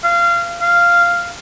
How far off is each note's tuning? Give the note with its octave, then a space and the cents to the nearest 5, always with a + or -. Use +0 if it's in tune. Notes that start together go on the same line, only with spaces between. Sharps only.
F5 -25
F5 -10